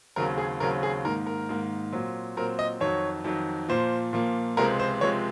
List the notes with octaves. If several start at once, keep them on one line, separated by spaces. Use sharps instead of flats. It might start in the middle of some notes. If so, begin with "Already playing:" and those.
D#2 C#3 F#3 C4 A#4
G#4
D#2 C#3 F#3 C4 A#4
G#4
G#2 D#3 A#3 A#4
A#4
G#2 D#3 A#3
A#2 F#3 C4
A#2 F#3 C4 A#4
D#5
F2 D#3 F#3 C#5
F2 D#3 F#3
A#2 F3 A#3 C5
A#2 F3 A#3
C#2 C3 F3 G#3 C4 A#4
C5
C#2 C3 F3 G#3 C4 C#5